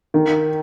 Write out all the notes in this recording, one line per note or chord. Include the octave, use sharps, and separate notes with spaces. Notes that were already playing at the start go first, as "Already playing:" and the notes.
D#3